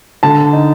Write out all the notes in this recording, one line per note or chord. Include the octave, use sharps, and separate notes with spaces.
D3 A5
D#4